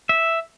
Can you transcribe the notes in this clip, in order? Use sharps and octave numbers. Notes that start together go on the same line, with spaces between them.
E5